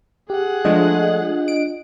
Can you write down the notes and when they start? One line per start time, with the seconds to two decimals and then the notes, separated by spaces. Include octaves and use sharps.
0.30 G4 G#4 F#5
0.65 F3 G#3 A3 D4 F4 D#5
1.48 D7